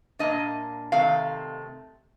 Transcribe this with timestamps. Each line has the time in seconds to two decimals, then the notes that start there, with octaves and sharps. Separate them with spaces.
0.19 A#2 F3 A#3 D4 D#5
0.92 C3 D#3 A3 C4 F5